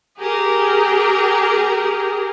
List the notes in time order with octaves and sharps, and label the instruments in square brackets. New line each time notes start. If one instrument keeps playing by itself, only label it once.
[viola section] G4 G#4 A#4 A#5